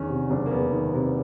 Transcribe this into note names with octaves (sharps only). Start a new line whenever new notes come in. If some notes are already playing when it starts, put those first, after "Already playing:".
Already playing: E2 D#3 C#4 D4
C3
F#1 D4
A#3
E2 B3
D#3
C3